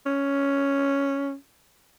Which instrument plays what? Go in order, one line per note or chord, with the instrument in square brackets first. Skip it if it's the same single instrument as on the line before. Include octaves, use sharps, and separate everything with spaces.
[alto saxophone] C#4